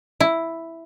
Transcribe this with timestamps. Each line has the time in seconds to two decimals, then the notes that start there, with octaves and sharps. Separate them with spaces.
0.20 E4